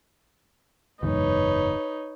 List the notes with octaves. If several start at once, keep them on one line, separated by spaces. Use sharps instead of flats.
F#1 E2 G#2 D#4 B4 C#5